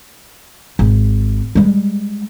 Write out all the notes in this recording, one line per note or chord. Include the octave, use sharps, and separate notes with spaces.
G#1
G3 G#3